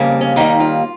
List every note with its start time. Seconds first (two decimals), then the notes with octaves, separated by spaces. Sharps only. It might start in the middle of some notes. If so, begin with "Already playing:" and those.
Already playing: F2 C#3 G3 A#3
0.21 C#4
0.36 D#2 D#3 G3 A#3 D#4
0.60 F4